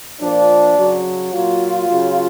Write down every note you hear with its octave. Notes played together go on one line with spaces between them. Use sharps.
A#2 F3 D4
C#3 F#3
A#2 F#3 F4
C#3 F#3